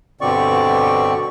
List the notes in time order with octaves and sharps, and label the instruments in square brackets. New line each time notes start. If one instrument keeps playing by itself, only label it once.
[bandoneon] G2 B2 D3 C4 D5 C#6